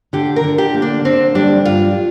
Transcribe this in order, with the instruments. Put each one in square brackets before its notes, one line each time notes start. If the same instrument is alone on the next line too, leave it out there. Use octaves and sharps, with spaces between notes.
[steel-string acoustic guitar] D3 [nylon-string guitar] G4
[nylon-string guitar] A#4
[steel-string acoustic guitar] D3
[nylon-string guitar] G4
[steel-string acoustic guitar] A#3
[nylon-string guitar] D4
[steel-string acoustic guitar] D3 [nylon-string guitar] C4
[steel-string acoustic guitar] G3 [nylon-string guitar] D4
[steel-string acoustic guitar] G2 [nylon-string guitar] F4